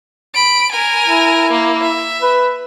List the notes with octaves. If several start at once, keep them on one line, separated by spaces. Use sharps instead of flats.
B5 D7
A#4 G#5
E4
A#3
E5
B4